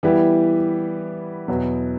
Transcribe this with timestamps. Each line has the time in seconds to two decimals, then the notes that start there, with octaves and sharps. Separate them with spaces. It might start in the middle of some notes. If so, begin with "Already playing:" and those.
0.03 E3 G3 B3 E4 G4
1.48 E2 B2 F#3 B3